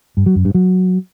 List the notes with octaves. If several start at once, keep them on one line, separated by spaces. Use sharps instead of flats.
G2
F#3
F#2
G2
F#3